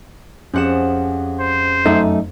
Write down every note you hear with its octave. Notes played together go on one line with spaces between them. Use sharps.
F2 C#4 G4 G#4 F#5 E7
C5
F#2 A3 D#4